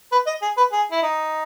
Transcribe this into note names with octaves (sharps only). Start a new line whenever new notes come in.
B4
D#5
G#4
B4
G#4
E4
D#4